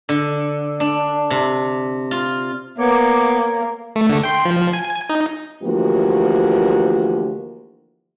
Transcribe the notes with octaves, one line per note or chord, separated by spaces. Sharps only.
D3
D4
C3
F4
A#3 B3 C#5 D6
A3
D3 A3
G5 C6
F3
G#5
D#4
D2 E3 F3 A#3 F#4 G4